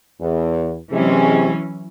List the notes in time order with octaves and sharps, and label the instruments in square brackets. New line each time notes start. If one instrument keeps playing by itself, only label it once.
[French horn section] E2
[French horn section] C3 G#3 [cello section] E3 F#3 C#4